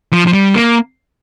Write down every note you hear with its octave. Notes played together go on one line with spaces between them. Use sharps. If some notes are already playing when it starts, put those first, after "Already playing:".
F3
F3
G3
A#3